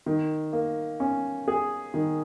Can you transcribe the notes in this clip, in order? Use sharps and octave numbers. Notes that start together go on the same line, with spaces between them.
D#3
A#3
C#4
G#4
D#3